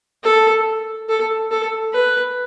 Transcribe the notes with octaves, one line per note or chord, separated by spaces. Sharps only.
A4
A4
A4
B4